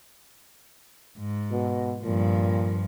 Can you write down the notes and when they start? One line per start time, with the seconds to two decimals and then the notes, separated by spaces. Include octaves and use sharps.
1.19 G#2
1.51 B2
2.03 G2 A#2 F3